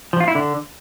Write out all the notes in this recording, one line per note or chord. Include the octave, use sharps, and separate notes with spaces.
F3
F4
E4
D3